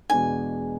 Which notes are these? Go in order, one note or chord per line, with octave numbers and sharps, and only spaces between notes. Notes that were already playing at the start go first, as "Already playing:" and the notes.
E2 B2 G#3 B3 D4 G#5